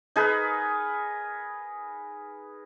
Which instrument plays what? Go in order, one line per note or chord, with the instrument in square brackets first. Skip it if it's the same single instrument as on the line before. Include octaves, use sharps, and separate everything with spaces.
[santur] D#4 G#4 A#4 B4